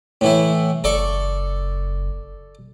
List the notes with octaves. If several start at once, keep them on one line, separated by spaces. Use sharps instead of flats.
A2 E3 E4
F#1 A4 D5 C#6